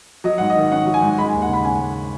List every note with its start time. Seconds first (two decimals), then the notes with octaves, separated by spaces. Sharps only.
0.24 F#3 D#5
0.38 G#2 F#5
0.50 D#5
0.56 D#3
0.71 C#4 F#5
0.86 F#3
0.94 G#5
1.02 G#2
1.18 G#3 B5
1.29 G#5
1.34 D#2
1.42 F#5
1.49 C#3 B5
1.64 C#4 G#5
1.80 G#3